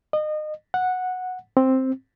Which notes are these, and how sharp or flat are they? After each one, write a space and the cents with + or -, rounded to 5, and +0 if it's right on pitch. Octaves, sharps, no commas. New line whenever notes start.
D#5 -30
F#5 -10
C4 +5